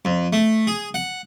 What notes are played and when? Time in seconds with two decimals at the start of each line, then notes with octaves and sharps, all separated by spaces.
0.05 F2
0.33 A3
0.67 G#4
0.94 F#5